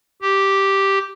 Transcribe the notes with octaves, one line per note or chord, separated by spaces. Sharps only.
G4